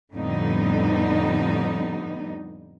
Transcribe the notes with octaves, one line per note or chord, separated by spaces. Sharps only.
F2 A2 D3 G3 B3 D#4